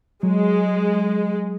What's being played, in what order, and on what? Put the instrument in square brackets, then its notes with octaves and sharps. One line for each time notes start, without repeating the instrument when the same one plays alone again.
[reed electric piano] F#3 [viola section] G#3